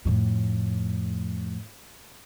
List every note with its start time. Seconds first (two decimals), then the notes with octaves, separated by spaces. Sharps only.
0.05 F2 A2